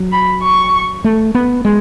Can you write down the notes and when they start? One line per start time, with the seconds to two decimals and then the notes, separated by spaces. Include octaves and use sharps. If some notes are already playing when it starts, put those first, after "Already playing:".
Already playing: F#3
0.12 B5
0.43 C#6
1.04 A3
1.35 B3
1.65 G#3